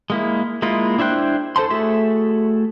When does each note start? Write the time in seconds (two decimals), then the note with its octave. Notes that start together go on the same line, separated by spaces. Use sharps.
0.10 G#3 A#3 E4
0.62 G#3 A#3 E4 F4
0.99 D4 E4 C5 G5 F#6
1.56 A4 C5 A5 C6
1.70 A3 F#4 G#4 A4 E5